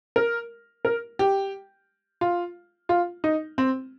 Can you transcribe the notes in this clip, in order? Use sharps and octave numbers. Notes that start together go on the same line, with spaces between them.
A#4
A#4
G4
F4
F4
D#4
C4